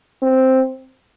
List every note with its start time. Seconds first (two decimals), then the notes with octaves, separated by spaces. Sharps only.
0.22 C4